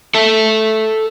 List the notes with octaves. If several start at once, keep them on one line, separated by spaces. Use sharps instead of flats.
A4 E5 A5